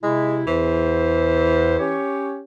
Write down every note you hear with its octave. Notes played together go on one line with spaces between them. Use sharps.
C3 G#3 E4
E2 E3 C5
C#4 G4 C#5